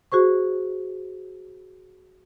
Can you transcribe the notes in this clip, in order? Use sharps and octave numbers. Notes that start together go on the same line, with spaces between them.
F#4 G#4 C5 C#6